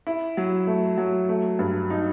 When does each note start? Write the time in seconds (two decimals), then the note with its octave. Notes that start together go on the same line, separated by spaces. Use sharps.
0.07 E4
0.37 F#3
0.67 A3
0.98 F#3
1.29 A3
1.59 G2
1.90 D#4